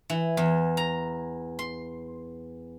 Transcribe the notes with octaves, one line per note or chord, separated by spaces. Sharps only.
E3
E2
A#5
C6